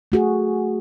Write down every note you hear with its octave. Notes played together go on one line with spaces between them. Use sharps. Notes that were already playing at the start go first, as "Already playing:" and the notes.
A3 F#4 G#4